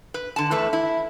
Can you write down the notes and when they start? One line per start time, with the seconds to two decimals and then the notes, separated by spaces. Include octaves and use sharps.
0.14 B4
0.36 D3 A5
0.51 E2 A3 B4
0.73 E4